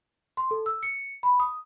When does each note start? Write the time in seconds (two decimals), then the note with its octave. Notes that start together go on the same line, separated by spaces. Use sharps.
0.37 C6
0.51 A4
0.66 E6
0.83 C#7
1.23 B5
1.40 D#6